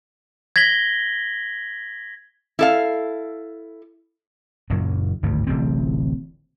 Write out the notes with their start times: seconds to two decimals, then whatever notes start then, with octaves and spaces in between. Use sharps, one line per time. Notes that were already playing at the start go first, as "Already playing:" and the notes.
0.56 G#6 A#6 B6 F#7 G7
2.59 E4 A4 F5
4.70 F#1 F#2 A#2 F#3
5.23 G#1 D2 G2
5.47 D1 A1 C3 C4